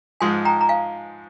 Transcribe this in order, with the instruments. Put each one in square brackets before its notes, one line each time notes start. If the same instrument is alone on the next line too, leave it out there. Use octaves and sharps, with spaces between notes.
[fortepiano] G#2 F3 G#3 [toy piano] G#5 C6
[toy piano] G5 A#5
A#5
F5 G#5